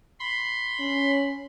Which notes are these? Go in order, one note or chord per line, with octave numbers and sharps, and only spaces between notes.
B5 C6
C#4